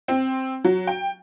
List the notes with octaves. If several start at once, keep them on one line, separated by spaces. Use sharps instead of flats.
C4
F#3
G5